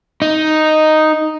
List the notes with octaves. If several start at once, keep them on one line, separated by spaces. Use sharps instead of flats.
D#4